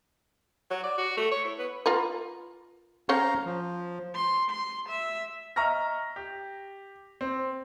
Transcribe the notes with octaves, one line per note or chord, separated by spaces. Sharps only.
F#3
D5
F#4
A3
C#5
E4
B3
F4 A#4 B4
C#4 C5 C#5 F5 A#5
F3
C6
C6
E5
D#5 E5 A#5 C#6 F6 A#6
G4
C4